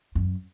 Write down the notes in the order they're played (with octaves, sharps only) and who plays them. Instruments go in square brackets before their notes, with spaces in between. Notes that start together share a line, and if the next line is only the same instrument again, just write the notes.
[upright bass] F#2